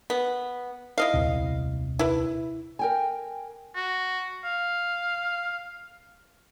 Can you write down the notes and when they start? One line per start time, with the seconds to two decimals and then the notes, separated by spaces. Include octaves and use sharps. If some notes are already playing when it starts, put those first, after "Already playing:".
0.10 B3
0.98 E4 D#5 F5
1.14 D#1 C2 C3
1.99 E4 B4
2.79 A#4 G5 G#5
3.75 F#4
4.44 F5